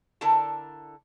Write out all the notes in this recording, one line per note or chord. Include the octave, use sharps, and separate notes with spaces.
D3 E4 A4 A#4 A5